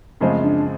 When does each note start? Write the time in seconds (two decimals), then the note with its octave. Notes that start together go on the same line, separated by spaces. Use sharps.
0.21 F#2 C#3 F3 G#3 A3 C4
0.44 D4